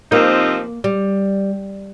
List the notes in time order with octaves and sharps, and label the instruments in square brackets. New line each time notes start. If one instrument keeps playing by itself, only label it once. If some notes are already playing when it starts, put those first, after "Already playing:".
[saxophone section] C3 F3 C4 D#4 [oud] A#3
[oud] G3